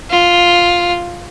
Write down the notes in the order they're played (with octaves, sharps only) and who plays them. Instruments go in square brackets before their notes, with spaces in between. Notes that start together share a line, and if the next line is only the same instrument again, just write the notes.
[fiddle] F4